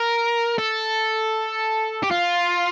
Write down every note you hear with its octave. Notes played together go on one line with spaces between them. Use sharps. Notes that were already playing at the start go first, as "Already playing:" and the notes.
Already playing: A#4
A4
G4
F4